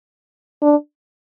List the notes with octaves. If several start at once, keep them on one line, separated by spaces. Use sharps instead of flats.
D4